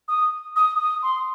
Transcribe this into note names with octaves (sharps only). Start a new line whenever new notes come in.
D#6
D#6
D#6
C6